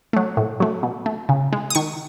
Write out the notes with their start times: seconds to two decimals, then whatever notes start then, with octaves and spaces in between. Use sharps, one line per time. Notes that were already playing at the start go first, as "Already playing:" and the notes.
0.13 F#3 A3
0.37 A2
0.60 F#3 A3
0.83 B2
1.06 A3
1.29 C#3
1.53 G#3
1.70 D#6
1.75 D#3 C#6